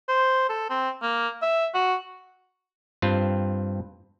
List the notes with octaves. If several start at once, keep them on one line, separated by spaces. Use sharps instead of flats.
C5
A4
C4
A#3
E5
F#4
G2 C4 F4